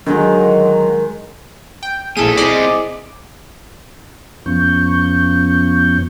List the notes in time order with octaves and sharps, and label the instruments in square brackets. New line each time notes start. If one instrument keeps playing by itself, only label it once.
[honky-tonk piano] D3 [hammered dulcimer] D#3 G#3 [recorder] F#3
[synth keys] G5
[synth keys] A#1 A4 D#7 [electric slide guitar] A#3 E4 [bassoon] G#4
[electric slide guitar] C4 E4 C5 [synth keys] D5 D#5 D6
[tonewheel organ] F2 F3 B3 C#4 C#6 G6